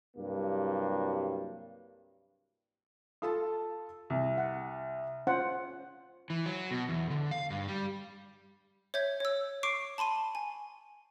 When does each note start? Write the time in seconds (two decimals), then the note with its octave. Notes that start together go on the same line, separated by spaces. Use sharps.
0.17 C2 G2 F#3 A#3
3.22 F4 A4 A5 D#6
4.10 C2
4.38 F#5
5.27 C#4 F4 C5 F#5
6.30 E3
6.46 F#3
6.71 B2
6.89 E2
7.10 D3
7.31 F5
7.50 G2
7.68 G3
8.94 C#5 E5 G6 G#6
9.20 C#5 E6
9.63 C#6 D6 C7 D7
9.98 A5 B5 C6 D#7
10.35 G#5